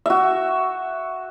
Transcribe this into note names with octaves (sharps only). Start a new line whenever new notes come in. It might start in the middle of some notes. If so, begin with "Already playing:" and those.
F#4 E5